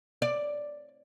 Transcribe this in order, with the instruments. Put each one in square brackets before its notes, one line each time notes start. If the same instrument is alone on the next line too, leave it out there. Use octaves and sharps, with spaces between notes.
[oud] D5